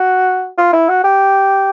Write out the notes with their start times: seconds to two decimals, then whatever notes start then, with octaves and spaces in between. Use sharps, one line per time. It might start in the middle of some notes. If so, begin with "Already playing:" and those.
Already playing: F#4
0.58 F4
0.73 E4
0.89 F#4
1.04 G4